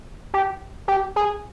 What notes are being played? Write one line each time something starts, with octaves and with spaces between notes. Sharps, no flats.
G4
G4
G#4